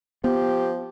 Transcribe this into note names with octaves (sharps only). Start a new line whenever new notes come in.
F3 B3 G4